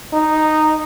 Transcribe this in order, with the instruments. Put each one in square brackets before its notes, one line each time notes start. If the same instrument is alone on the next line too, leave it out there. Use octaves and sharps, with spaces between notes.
[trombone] D#4